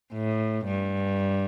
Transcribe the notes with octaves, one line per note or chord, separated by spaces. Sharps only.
A2
G2